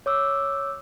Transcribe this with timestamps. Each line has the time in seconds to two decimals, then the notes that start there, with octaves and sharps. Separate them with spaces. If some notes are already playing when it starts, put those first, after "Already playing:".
0.06 C#5 D6 E6